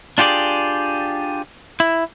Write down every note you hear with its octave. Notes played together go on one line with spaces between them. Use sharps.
D4 F4 G4 G#4 D5
E4